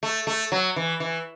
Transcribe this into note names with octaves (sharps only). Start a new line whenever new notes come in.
A3
A3
F#3
E3
E3